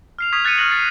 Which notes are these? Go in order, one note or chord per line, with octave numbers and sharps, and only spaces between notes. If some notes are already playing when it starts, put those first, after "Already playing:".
F6 C7 F7
C#6 D#6 G#6 B6 F7
F#6 A6 B6 C#7 D#7
F6 F#6 A#6 F#7
A6 C7